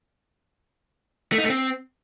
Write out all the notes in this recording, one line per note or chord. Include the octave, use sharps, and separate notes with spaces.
A3
D#4
A3
C4